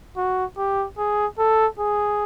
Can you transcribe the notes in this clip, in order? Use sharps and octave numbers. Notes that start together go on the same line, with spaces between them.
F#4
G4
G#4
A4
G#4